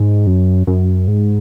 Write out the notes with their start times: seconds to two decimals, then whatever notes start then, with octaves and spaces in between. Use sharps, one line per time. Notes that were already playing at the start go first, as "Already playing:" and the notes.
Already playing: G#2
0.27 F#2
0.67 F#2
1.08 G#2